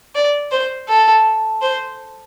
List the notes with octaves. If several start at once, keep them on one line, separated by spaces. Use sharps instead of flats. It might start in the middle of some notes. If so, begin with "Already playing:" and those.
D5
C5
A4
C5